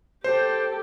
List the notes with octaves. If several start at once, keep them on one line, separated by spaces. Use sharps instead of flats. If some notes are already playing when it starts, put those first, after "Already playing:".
G4 A4 C5